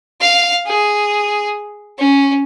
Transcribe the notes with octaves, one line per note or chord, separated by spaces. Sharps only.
F5
G#4
C#4